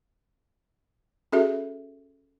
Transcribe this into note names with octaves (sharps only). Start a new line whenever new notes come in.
C#4 F#4 G#4 A4 E5